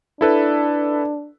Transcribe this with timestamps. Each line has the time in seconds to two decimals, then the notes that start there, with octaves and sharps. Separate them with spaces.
0.21 D4 E4 A4 B4